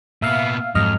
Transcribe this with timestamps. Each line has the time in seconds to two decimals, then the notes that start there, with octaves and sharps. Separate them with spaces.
0.22 A#2 B3 E5 F5
0.75 F2 G#2 F#3 D#5 F6